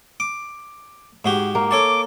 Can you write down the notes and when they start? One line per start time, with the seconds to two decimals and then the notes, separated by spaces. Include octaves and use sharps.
0.20 D6
1.25 G#2 F#4 G4
1.55 A#3
1.71 A4 C#5 A5 D6